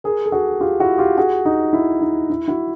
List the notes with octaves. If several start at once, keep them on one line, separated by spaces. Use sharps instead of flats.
G#4 A#4
A4
F#4 G#4
F4 G4
E4 F#4
F4 G4
F#4 G#4
D#4
E4
D#4
E4
E4 F#4